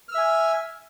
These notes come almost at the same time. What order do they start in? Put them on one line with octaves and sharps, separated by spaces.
F6 E6 E5 G#5